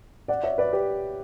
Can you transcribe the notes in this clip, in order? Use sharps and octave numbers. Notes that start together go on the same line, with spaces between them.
D5 F#5
C#5 E5
B4 D5
G4 B4